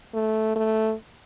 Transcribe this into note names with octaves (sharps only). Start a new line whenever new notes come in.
A3
A3